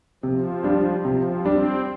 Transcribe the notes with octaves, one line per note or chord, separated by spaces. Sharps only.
C3 F3
G3 D4
C3 F3
G3 C4 D4